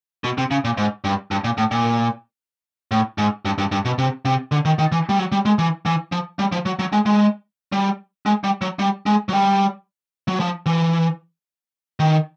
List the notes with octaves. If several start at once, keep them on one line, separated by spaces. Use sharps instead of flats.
B2
C3
C#3
A#2
G#2
G2
G2
A#2
A2
A#2
A2
G#2
G2
G2
G2
B2
C3
C3
D3
D#3
D#3
E3
G3
F#3
G3
G#3
E3
E3
F3
G3
F3
F#3
F#3
G#3
G#3
G3
G#3
G3
F#3
G3
G#3
F#3
G3
F#3
F3
E3
D#3